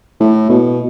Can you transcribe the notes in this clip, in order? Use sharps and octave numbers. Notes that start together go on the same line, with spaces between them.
A2
B2